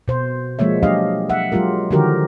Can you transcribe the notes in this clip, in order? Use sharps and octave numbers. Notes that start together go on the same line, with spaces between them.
B2 C5
F3 G#3 A#3 C#5 E5
F#3 D4 G4 D#5 F5
E5 F#5
F#3 G#3 F4 G4 A#4
D3 D#3 F3 F#4 G4 A#4